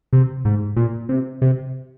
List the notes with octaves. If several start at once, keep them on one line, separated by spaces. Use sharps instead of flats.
C3
G#2
A#2
C3
C3